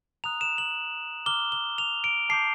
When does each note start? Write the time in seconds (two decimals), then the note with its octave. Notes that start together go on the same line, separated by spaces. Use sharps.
0.24 A#5 D#6 F#6 F7
0.41 E7
0.58 F#7
1.26 A#5 D6 F6 G7
1.52 G7
1.78 F7
2.04 D7
2.29 A5 D6 G6 C7